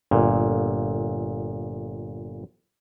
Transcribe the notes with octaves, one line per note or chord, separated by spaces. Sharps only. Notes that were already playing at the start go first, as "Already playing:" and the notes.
G1 A#2